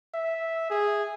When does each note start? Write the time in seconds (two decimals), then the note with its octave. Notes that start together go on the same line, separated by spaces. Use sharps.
0.14 E5
0.70 G#4